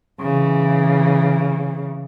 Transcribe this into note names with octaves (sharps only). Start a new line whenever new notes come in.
C#3 E3